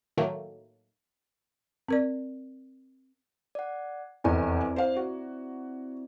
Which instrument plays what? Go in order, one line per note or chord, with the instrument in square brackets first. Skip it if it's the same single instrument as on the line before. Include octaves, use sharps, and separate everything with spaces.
[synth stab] A2 D#3 F#3 A3 A#3
[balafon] C4 A#4 D5
[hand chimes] D5 F#5
[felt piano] F1 E2 G#5 [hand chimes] C4 E4 D5
[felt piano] C5 F5
F#4